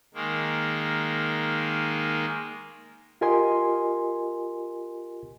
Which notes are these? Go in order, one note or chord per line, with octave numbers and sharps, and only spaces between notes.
D#3 G#3 A#3
F4 G4 A#4 D#5 G#5 C6